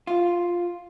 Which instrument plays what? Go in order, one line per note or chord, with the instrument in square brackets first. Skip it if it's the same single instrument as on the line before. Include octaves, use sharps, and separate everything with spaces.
[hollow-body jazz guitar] F4